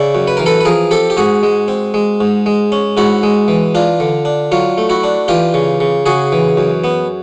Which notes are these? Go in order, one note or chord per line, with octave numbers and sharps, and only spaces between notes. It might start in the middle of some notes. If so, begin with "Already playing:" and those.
Already playing: C#3 D5 E5
F#2
B4
E3 A#4
A4 B4
B4
F3 G#4 A#4
C4 G4 A4
G4
G#2 F#4 G#4
G#3
C4
G#3
G#2
G#3
C#4
G#2 E4 F#4
G#3
E3
D4 F4
D3
D4
F#3 F4
A3
E4 F#4
D4
E3 F4 G4
C#3
C#3
C#3 F#4 G#4
E3
F#2
B3